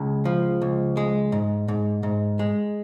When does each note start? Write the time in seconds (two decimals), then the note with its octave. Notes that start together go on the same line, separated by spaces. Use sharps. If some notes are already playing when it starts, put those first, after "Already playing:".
Already playing: C#2 C#3
0.25 F3
0.62 C#2
0.97 G#3
1.32 G#2
1.68 G#2
2.03 G#2
2.39 G#3